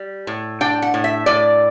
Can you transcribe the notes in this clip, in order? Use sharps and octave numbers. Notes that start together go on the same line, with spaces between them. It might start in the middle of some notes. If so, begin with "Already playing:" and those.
Already playing: G3
A2
D4 G5
F#5
A2
E5
A2 D5